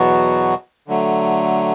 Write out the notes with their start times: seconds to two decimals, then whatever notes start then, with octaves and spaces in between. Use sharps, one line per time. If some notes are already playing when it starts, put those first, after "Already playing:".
Already playing: E2 B2 F#3 B3 F#4
0.88 D3 F#3 A3